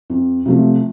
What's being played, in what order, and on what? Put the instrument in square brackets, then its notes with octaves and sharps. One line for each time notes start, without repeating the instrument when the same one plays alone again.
[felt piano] F2
C3 F3 A3